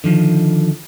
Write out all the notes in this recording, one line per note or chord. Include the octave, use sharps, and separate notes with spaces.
D3 D#3 F3